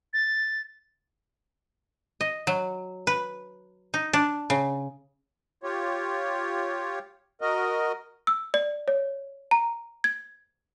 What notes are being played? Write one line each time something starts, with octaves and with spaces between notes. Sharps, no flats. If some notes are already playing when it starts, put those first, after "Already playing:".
A6
D#5
F#3
B4
D#4
D4
C#3
F4 G4 C#5
F#4 A#4 D#5
E6
D5
C#5
A#5
G#6